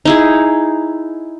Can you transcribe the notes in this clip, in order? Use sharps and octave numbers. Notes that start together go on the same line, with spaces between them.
D#4 E4 G#4